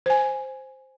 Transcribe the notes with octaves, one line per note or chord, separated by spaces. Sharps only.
C5 G#5